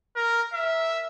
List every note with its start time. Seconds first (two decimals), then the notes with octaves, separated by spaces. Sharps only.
0.16 A#4
0.53 E5